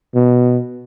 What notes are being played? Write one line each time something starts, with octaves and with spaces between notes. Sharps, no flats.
B2